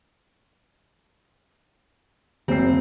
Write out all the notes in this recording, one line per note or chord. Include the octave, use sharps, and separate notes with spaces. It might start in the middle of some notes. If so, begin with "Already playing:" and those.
F#1 C4 C7